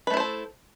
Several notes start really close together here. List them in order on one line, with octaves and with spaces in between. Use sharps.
B4 A3 E4 C5 A4